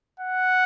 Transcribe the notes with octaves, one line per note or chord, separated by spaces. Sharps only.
F#5